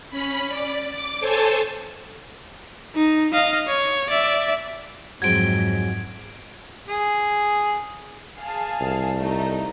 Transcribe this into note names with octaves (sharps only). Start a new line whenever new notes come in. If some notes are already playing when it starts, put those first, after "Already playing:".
C#4 B5
D5
D6
A4 C5 C#5 G#5 A5
D#4
D#5 F5
C#5
D5 E5
F2 G#2 F#3 G#3 C4 G#6 D7
G#4
G#4 F5 A5
C2
A3 D#4